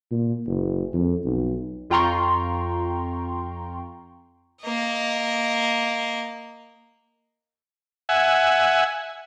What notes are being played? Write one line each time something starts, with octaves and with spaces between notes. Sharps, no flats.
A#2
F#1
F2
B1
F2 F4 G5 A#5 C6 C#6
A#3 D#5
E5 F#5 G#5